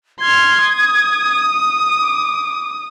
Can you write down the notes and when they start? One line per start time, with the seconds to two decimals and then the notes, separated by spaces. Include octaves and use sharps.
0.21 C6 F6 G#6
0.64 D#6
2.00 D6